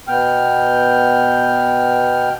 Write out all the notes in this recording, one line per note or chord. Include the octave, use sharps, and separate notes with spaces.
B2 B3 G5 F6